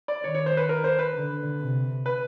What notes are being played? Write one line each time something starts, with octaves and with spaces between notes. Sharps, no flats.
D5
D#3 C#5
C#5
C5
B4
A#4
C5
B4
D3
C3
B4